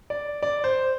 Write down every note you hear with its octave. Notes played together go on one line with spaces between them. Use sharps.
D5
D5
C5